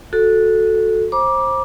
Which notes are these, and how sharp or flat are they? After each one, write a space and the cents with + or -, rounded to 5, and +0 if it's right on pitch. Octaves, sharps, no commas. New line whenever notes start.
F#4 -15 A4 +0
C5 +25 A#5 +40 D6 +0